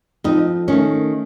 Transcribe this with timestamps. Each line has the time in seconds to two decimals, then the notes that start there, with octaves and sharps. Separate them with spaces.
0.24 F2 D#4
0.68 D#3 A3 C#4